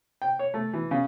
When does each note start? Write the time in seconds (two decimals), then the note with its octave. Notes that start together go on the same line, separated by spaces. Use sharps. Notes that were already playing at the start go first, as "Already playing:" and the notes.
0.22 G5
0.39 C#5
0.54 A3
0.73 E3
0.91 C#3